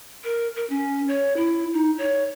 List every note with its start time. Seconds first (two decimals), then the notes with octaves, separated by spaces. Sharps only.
0.24 A#4
0.56 A#4
0.70 C#4
1.08 C#5
1.37 E4
1.73 D#4
1.98 C#5